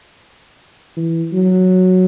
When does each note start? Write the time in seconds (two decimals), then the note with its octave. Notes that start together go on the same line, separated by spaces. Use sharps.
0.96 E3
1.33 F#3